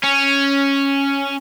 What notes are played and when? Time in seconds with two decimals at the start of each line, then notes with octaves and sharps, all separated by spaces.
0.03 C#4